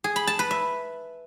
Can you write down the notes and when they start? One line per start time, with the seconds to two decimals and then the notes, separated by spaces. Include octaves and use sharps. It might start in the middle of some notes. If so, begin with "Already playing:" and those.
0.04 G#4
0.16 B5
0.27 A5
0.39 B4
0.51 E5